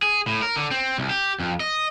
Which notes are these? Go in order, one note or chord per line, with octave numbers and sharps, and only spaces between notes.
G#4
A2
A#4
D3
C4
C2
G4
F2
D#5